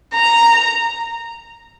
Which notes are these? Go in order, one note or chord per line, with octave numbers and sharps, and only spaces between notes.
A#5